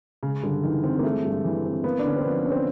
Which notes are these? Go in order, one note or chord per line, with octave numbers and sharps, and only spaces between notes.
C#3 G#3
G2 D3
D#3 E3
D#3 C4
A#3
G#3 A3
G2
E3
C4
A#3 B3
D4
D3 C#4
C4
F3 B3
B3
C#4
C4